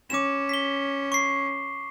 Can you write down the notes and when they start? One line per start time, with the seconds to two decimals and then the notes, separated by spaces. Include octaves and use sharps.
0.10 C#4 D6 E7
0.49 B6 G7
1.12 C#6 C7